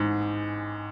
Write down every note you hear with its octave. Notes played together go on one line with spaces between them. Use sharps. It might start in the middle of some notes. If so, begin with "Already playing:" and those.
Already playing: A1 G#2